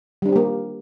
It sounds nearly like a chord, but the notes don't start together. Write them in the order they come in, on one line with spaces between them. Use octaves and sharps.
G3 D4 C4 G4 A#3